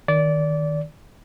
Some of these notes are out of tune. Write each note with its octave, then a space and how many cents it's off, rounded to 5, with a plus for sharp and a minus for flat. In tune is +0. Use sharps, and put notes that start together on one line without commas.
D#3 +0 D5 -20